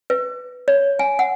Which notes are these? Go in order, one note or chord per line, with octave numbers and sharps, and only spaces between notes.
B4
C#5
G#5
F#5